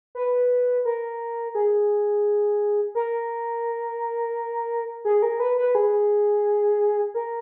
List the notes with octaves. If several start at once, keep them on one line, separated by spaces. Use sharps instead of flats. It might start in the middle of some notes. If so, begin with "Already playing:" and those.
B4
A#4
G#4
A#4
G#4
A#4
B4
B4
G#4
A#4